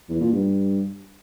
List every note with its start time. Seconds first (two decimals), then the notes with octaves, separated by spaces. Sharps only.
0.09 E2
0.20 A#2
0.32 G2